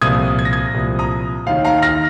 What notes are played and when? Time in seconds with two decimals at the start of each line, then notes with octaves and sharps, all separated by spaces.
0.01 C2 A#2 F3 D#6 G#6
0.39 G#6
0.45 A#6
0.53 D#6 G#6
0.74 C2 A#2 F3
0.99 A#5 D#6
1.46 D#2 D#3 F5
1.64 F5 A#5
1.82 F6 A#6